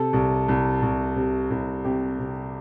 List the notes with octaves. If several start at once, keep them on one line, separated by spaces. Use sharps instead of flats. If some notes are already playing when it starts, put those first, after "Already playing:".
Already playing: C3 A4
C2
C2
C2
C3
C2
C3 G4
C3